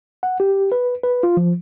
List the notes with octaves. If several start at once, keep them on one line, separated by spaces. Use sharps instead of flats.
F#5
G4
B4
B4
F4
F3